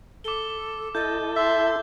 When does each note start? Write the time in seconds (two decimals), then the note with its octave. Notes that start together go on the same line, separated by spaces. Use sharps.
0.24 A4 D6 G7
0.95 E4 A4 D#5 G6 A6
1.36 E5 C6